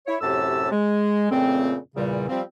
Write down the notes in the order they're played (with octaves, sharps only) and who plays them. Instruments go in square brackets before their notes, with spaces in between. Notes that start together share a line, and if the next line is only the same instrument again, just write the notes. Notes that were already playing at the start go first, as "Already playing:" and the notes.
[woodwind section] E4 C#5
F#2 A2 C3 G4 A5 E6
G#3
F2 A#2 C#3 A3 C4
E2 A#2 C#3 G3
F3 G3 C4